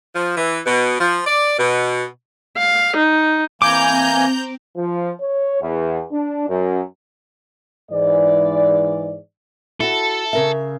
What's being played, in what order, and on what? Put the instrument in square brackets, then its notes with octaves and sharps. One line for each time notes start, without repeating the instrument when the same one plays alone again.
[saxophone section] F3
E3
B2
F3
D5
B2
[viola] F5
D#4
[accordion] E3 A#3 G#5 [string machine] C4 [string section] A#5 G6 [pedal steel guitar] D6
[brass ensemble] F3
C#5
E2
D4
F#2
[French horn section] G#2 E3 D5
[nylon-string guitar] E4 F#4 [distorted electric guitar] A4
[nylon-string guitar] C#3 A#4 E5